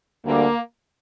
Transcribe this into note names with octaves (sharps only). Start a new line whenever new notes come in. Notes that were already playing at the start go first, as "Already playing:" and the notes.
D2 D3 G3 A#3